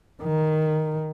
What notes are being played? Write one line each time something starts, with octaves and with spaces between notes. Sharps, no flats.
D#3